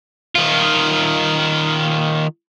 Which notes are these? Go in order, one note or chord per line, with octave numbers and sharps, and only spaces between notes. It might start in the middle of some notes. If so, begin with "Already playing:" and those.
D#3 F4